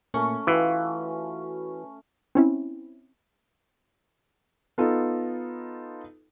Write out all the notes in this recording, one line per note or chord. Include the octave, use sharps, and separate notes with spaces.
A#2 A3 A#3 C#4 C#6
E3 F4 F#4 B4 F5 G5
C4 C#4 E4
B3 D#4 F4 A4